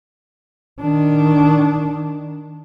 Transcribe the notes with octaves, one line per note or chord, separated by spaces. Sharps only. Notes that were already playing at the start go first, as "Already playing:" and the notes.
D#3 D4